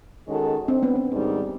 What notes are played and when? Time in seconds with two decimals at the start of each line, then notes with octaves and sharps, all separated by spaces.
0.27 D#3 G#3 C#4 F#4 A4
0.68 C4 D4
0.82 B3 C#4
0.96 B3
1.09 G#2 D#3 G3